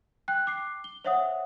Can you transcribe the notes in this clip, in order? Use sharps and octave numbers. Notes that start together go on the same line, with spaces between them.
G5 F#6
D6 C7
G7
C5 C#5 E5 F#5 D#6